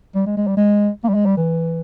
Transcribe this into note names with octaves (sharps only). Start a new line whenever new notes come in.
G3
G#3
G#3
G3
G#3
A#3
G3
G#3
G3
E3